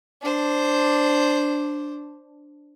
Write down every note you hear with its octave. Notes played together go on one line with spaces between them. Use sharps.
D4 C5